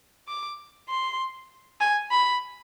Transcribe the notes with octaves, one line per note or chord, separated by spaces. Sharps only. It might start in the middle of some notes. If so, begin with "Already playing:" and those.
D6
C6
G#5
B5